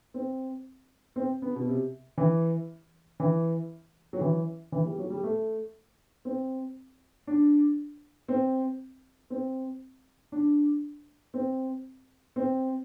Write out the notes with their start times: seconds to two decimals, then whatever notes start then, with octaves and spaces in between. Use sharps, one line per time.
0.14 C4
1.16 C4
1.42 B3
1.55 B2
1.67 C3
2.18 E3
3.20 E3
4.13 F#3
4.21 E3
4.72 E3
4.85 G3
4.98 F#3
5.10 G3
5.24 A3
6.25 C4
7.27 D4
8.28 C4
9.30 C4
10.32 D4
11.34 C4
12.36 C4